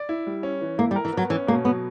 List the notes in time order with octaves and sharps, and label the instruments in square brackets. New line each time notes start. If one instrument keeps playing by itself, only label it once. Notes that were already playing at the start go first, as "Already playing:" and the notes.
Already playing: [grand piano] D5
E4
G3
C#4
E3
[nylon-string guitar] A#3 [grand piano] E4
[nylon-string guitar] G3
[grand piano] A#4
[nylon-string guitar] E3
[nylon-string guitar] F#3 [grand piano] B3
[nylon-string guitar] E3 [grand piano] C#4
[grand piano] B2 [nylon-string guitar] A#3
[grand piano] F#3 [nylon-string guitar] B3